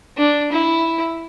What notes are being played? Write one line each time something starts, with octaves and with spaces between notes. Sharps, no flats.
D4
E4